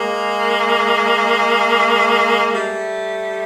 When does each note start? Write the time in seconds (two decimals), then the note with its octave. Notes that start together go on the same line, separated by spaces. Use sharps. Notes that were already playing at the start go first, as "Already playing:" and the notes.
Already playing: G#3 A#3
2.54 G3 A3